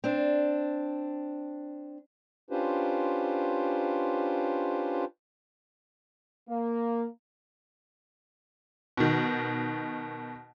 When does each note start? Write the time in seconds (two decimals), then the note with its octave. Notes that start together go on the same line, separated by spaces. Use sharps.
0.04 C4 D4
2.50 C#4 D4 F4 G4 B4 C5
6.49 A#3
8.97 B2 D#3